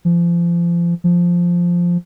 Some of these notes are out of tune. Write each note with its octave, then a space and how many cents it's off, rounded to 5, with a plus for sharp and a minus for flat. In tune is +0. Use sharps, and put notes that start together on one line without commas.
F3 -30
F3 +0